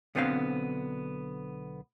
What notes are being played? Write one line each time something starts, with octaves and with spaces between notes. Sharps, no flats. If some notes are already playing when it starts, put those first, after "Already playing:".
B1 D3 B3 C4 C5 F5